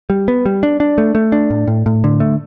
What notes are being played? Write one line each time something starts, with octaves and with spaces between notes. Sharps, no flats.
G3
B3
G3
D4
D4
A3
A3
D4
A2
A2
A2
D3
A3